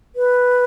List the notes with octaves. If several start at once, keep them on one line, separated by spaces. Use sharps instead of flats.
B4